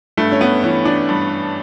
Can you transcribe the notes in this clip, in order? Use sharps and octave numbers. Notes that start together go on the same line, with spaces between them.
G2 A3
C#4
B3
E3 C#4
D4
G2